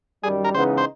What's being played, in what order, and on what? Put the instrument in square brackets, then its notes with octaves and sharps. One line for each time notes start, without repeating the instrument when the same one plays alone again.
[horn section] F#2 D#3 G3 [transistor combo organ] G#4
[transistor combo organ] A#4
[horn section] C#3 E3 G#3 B3 D#4 [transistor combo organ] C5
[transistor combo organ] C5